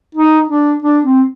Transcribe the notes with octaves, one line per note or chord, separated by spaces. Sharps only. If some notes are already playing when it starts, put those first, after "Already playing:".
D#4
D4
D4
C4